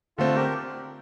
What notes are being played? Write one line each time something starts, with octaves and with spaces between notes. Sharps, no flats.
D3 A3 C4 F4 A4
G4 A#4